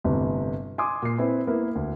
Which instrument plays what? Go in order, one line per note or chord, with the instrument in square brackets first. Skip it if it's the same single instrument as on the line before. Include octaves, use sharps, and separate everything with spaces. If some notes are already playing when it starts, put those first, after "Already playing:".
[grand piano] G1 A2 C3
G#5 C6 D6 D#6
A#2 C7
C4 E4 B4
A#3 B3 E4
D2